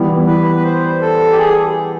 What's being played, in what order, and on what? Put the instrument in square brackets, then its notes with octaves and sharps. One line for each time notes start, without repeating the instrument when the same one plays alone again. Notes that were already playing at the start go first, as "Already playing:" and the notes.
Already playing: [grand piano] E3 G3 B3
[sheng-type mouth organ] B4
B4
C5
A4
G4
G#4